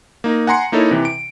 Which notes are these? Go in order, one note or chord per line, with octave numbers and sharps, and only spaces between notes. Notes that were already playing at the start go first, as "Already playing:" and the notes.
A#3 D#4
F#5 G#5 A#5 C6 C#7
A#3 D#4 E4 A4 C#5
C3 E3
D7